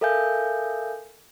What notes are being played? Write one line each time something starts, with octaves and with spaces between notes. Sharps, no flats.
A4 A#4 E5 F5 G#5 G6